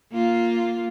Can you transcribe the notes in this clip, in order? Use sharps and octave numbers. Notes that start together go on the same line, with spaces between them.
A#3 F4